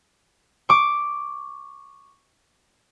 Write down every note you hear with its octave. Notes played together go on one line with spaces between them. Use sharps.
C#6 D6